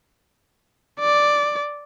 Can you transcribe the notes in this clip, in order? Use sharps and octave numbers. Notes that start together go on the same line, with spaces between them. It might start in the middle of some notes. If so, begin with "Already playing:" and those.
D5